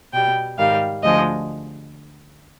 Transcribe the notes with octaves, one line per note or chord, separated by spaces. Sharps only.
B2 G3 G5
G#2 D#3 G3 F5
D2 D3 F3 G#3 D#5